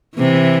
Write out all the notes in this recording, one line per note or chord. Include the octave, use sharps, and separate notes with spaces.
C3 E3